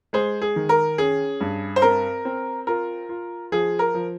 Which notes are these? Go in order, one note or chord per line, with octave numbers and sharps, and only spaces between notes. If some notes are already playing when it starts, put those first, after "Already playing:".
G#3 G#4 C5
G#4
D#3
A#4
C#4 G#4
G2
C5
C4 A#4
C4
F4 A#4
F4
F3 G#4
A#4
F3